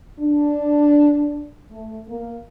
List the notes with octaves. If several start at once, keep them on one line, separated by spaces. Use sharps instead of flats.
D4
A3
A#3